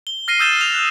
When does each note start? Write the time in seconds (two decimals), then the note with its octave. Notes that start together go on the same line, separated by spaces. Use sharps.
0.07 G7
0.28 F6 A#6 C7 D#7 G7
0.39 D#6 E6 G6 A6 E7 G7
0.57 F6 F7
0.74 F#6